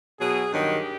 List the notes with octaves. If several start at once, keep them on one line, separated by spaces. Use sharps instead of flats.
B2 F#3 G#4
G2 D#3 F#3 G4